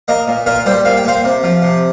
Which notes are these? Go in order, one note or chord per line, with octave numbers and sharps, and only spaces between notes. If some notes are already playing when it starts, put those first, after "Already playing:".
A#3 A#4 D#5
A#2
A#2 F4 A#4
G3 G4 C5
A#2 F5
G5
A#3 C5 F5
C3
F3
C3